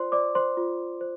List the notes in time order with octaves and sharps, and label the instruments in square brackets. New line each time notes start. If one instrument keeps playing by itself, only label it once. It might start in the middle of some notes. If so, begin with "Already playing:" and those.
Already playing: [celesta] F4 C5 D5 C6
C5 D5 D6
C5 C6
F4
C5